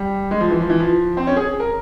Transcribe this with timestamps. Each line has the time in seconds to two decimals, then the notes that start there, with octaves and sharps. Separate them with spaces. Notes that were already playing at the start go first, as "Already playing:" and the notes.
Already playing: G3
0.31 G#3
0.40 F3
0.51 E3
0.60 F3
0.70 E3
0.80 F3
1.17 C4
1.27 C#4
1.36 G#4
1.60 A#4